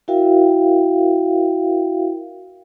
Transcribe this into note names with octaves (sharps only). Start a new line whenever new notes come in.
E4 F#4 A#4 E5 F5 G5